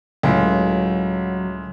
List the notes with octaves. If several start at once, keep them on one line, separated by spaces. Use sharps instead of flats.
C#2 A2 F#3